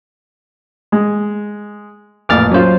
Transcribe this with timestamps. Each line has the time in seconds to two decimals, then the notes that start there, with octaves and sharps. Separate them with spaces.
0.92 G#3
2.29 A1 F2 A#2 D6 F6 A6
2.51 F#3 C#4 F4 C5